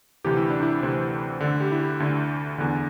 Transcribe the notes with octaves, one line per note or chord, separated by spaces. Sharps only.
D2 C3 E3 G4
E4
D4
E4
D2 C3 E3 C4
D2 D3
G4
E4
G4
D2 D3
E2 D3